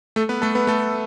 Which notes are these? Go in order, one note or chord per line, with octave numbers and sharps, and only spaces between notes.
A3 A4
B3 B4
A3 A4
B3 B4
A3 A4